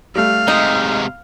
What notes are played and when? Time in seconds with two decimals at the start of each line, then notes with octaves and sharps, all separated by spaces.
0.16 G3 A3 F5
0.48 C3 G#3 D#4